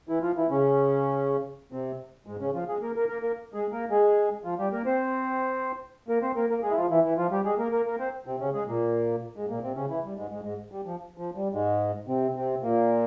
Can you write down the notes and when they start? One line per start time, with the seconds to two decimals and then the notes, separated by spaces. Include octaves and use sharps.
0.09 E3 E4
0.22 F3 F4
0.37 E3 E4
0.50 C#3 C#4
1.72 C3 C4
2.27 G#2 G#3
2.40 C#3 C#4
2.54 F3 F4
2.68 G#3 G#4
2.82 A#3 A#4
2.96 A#3 A#4
3.09 A#3 A#4
3.22 A#3 A#4
3.54 G#3 G#4
3.72 A#3 A#4
3.90 G#3 G#4
4.45 F3 F4
4.59 G3 G4
4.73 A#3 A#4
4.86 C4 C5
6.09 A#3 A#4
6.22 C4 C5
6.36 A#3 A#4
6.50 A#3 A#4
6.63 G#3 G#4
6.71 E4
6.77 F3 F4
6.90 E3 E4
7.04 E3 E4
7.18 F3 F4
7.31 G3 G4
7.45 G#3 G#4
7.58 A#3 A#4
7.72 A#3 A#4
7.86 A#3 A#4
7.99 C4 C5
8.26 C3 C4
8.40 C#3 C#4
8.54 G#3 G#4
8.68 A#2 A#3
9.36 G#2 G#3
9.50 A#2 A#3
9.63 C3 C4
9.76 C#3 C#4
9.90 E3 E4
10.04 G3
10.17 G#2 G#3
10.31 G#2 G#3
10.44 G#2 G#3
10.72 G3
10.86 F3
11.18 F3
11.35 G3
11.53 G#2 G#3
12.08 C3 C4
12.36 C3 C4
12.63 A#2 A#3